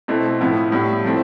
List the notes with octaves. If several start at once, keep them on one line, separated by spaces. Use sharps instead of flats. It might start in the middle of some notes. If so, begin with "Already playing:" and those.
B2 A3 C4 E4
A2 F3 B3 E4
A2 G3 B3 E4
F3 A3 C4 E4